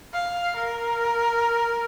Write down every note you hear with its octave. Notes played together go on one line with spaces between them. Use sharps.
F5
A#4